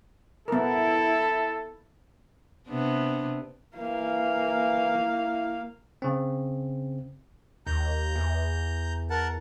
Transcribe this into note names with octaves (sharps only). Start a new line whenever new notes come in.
B3 E4 A4 A#4
C3 B3 D4
E3 A#3 F5
E4
C#3 C4
D#2 A#5 G6
E2
A#4 F#5 A5